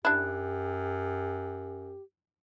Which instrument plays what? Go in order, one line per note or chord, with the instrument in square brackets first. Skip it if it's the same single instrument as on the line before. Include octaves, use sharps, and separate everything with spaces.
[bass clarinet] F#2 [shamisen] D4 E4 [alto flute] G4 [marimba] F#6